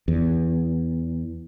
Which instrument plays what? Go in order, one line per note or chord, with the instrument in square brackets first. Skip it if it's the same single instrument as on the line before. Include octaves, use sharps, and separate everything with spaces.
[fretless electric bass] E2